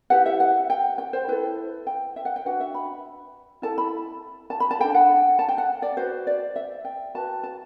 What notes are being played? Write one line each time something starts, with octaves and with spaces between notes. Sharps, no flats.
E4 G4 B4 F#5
E5
F#5
G5
G5
C5
E4 A4 B4
G5
E5
F#5
G5
D4 F#4 B4 F#5
E5
B5
E4 A4 A5
B5
A5
B5
A5
D4 A4 G5
F#5
A5
G5
F#5
D5
F#4 B4 C5
D5
E5
G5
F#4 B4 A5
A5